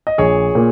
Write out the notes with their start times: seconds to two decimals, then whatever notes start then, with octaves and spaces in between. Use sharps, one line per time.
0.07 D#5
0.18 A#1 G#4 C#5
0.55 A#2 A#3